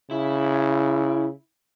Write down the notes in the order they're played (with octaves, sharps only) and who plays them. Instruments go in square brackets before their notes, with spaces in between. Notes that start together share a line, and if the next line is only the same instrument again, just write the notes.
[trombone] C#3 [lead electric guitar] E4